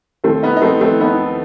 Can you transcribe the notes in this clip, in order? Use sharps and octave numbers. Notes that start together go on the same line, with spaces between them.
D#2 D#3 A3 C4
B3 D#4
D#4
A3 C4
A3 C4
D#2 D#3 B3 D#4